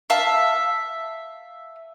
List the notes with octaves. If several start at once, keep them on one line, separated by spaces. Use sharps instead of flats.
E5 F5 A5